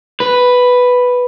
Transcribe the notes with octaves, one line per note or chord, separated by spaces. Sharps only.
B4